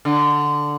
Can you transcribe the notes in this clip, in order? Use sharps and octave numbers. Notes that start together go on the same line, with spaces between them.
D3